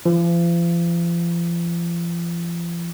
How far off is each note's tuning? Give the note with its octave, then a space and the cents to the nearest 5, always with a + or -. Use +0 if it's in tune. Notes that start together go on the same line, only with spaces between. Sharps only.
F3 -40